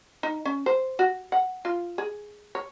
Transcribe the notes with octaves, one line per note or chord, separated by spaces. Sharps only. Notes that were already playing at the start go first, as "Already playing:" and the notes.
D#4
C#4
C5
F#4
F#5
F4
G#4
C#5